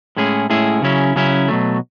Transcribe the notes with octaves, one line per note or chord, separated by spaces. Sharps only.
A2 G#3 C#4 E4 G#4
A2 G#3 C#4 E4 G#4
C#3 F#3 C#4 E4
C#3 F#3 C#4 E4
B2 F#3 A3